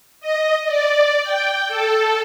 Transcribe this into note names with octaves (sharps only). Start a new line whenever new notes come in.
D#5
D5
G5
A4